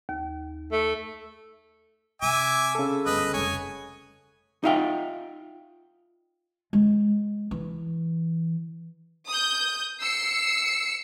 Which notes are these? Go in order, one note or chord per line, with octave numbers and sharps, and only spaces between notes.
D#2
A3
C3 E5 G#5 D6
C#3 A4
G1 D2 B4 D#5
F1 C2 C#5 G#5
D#4 F4 E5 F5 G5
G#3
E3
D#6 G6
E6 C7 C#7